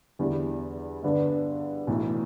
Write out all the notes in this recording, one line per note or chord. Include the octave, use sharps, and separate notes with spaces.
E2 D3 G3 E4
G2 D3 B3 D4 B4
B1 A2 E3